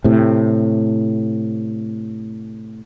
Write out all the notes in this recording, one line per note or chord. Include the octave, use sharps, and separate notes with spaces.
A2 C3